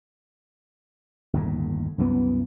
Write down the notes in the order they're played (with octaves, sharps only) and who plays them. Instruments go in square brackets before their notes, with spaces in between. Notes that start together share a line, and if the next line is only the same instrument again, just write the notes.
[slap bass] G1 D#2 A2
C2 F#2 E3 B3